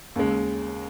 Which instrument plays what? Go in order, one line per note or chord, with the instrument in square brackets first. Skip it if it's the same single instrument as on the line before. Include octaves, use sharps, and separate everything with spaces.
[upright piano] D#2 C#3 G#3